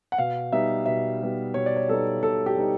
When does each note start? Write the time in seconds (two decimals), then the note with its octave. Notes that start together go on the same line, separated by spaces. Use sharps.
0.12 F#5
0.18 B2 F5
0.52 G3 B3 D#4 E5
0.86 B2 E5
1.20 G3 B3 D#4
1.54 B2 C#5
1.66 D5
1.76 C#5
1.88 G3 B3 D#4 A4
2.23 B2 A4
2.46 G4
2.57 G3 B3 D#4